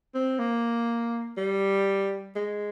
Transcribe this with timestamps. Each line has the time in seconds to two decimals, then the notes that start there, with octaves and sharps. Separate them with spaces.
0.14 C4
0.39 A#3
1.37 G3
2.36 G#3